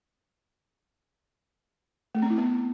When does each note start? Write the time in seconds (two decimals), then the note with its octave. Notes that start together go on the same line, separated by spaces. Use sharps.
2.15 A3
2.22 C4
2.30 E4
2.38 B3